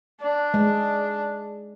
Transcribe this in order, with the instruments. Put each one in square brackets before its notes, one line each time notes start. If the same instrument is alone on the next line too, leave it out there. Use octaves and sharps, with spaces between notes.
[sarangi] D4
[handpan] G#3